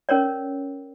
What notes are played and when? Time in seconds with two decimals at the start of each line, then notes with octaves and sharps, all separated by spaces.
0.09 C#4 A#4 C#5 D5